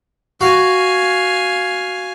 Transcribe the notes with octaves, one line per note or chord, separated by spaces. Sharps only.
F#4 F5 G#5